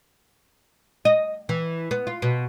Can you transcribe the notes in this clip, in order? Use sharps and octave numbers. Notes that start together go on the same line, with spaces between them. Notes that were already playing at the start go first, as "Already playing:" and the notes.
D#5
E3
B3
F4
B2